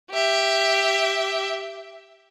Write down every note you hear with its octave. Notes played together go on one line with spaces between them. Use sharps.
G4 E5